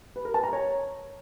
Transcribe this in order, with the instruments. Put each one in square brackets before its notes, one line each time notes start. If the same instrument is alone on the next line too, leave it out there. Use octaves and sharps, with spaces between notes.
[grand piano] B4
A#4
A5
A#5
C#5